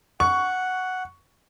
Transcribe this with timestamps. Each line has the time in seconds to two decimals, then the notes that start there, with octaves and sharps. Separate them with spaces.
0.20 F#5 C#6